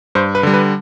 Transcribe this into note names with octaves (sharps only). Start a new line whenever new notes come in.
G2 C5
B4
D3 G3
B4